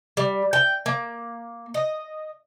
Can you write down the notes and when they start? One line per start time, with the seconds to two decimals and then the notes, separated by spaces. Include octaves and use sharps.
0.17 G3
0.53 G5
0.86 A#3
1.74 D#5